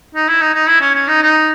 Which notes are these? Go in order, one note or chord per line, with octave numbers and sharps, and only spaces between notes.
D#4
E4
D#4
D#4
E4
C#4
C#4
D#4
D#4